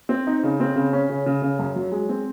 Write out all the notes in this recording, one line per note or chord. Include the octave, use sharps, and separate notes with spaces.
C4
D#4
C#3
C4
C#3
C#4
C#3
C#3
C#3
F#2
F#3
G#3
C4